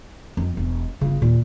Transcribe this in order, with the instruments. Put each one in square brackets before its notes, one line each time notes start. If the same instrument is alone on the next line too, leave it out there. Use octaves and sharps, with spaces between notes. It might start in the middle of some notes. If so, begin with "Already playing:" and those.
[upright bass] F2
E1
[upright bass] G1 F4 [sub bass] C#3
[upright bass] D#2 [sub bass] A#2